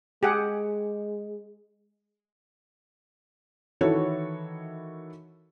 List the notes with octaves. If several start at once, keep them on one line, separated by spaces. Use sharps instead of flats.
G#3 G4 G#4 F#5
D#3 E3 E4 F#4 A4 C#5